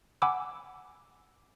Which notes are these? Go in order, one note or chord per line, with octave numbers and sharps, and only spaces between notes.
F#5 G#5 B5 D6 E6